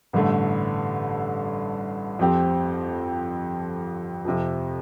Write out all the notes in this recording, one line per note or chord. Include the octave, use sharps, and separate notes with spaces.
A1 G2 D3 A3
F2 F3 C4 G4
F2 C3 F3